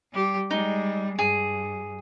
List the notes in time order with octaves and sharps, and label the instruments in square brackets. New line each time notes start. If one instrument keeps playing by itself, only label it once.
[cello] G3 G4
[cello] G3 G#3 [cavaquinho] D#4
[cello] G2 [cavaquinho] G#4